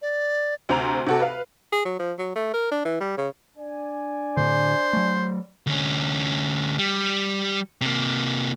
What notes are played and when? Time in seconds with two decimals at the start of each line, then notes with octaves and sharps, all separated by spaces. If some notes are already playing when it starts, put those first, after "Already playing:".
0.02 D5
0.69 D2 C3 C5 A#5 F7
1.07 C3 F#4 A4
1.20 B4 F5
1.72 G#4
1.85 F#3
1.99 F3
2.19 F#3
2.36 A3
2.54 A#4
2.71 D4
2.85 E3
3.00 G3
3.18 C#3
3.57 D4 D5 G#5
4.37 A2 D3 C5
4.93 F#3 A3
5.67 D2 C#4
6.78 G3
7.81 C3 A#3